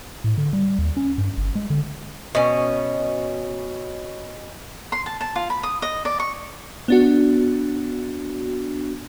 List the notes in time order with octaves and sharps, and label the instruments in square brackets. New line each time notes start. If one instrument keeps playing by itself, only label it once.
[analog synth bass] A2
D3
G3
D#2
C#4
G2
G1
G#3
D3
[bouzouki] B2 C#4
[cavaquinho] C6
A5
A5
F4
B5
D#6
D#5
D5
C#6
[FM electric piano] B3 D4 F#4